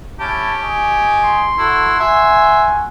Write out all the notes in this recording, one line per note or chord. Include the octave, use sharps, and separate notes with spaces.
C#4 E4 G4 A5
D#5 G#5 C#6
C6
E4 F#4 A4
F#4 E5 G#5